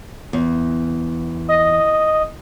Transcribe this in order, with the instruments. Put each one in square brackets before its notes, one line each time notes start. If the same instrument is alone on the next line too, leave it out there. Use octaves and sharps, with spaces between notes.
[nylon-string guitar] E2
[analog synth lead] D#5